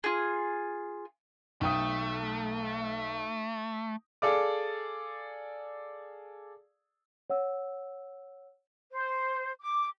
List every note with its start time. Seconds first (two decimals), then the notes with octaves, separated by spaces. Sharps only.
0.04 F4 G#4
1.61 B1 A3 G5 D#6
4.22 G#4 A4 D5 F5 D6
7.30 C#5 F#5 E6
8.91 C5
9.62 D6